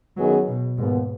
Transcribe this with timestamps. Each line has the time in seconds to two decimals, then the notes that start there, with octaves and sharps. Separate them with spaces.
0.17 F#2 D#3 F#3 B3 D#4 G#4
0.48 B2
0.78 D#2 G#2 D#3 G#3 B3